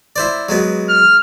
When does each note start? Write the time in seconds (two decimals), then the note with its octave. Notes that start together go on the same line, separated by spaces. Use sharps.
0.16 E4 C5 D5
0.49 F#3 G#3 B3
0.89 F6